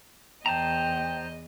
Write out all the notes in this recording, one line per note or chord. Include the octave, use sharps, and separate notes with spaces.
E2 C5 D#5 G5 A5 A#5